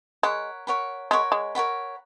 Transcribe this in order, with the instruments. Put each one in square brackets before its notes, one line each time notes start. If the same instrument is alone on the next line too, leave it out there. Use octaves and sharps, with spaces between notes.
[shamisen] G#3 [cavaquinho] A#4 C#5 F#5 B5
[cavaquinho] A#4 C#5 F#5 B5
[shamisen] G#3 [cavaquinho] A#4 C#5 F#5 B5
[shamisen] G#3
[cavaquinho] A#4 C#5 F#5 B5